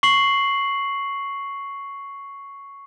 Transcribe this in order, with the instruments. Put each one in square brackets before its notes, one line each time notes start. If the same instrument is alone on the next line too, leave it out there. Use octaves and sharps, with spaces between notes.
[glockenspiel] C#6 C7 F#7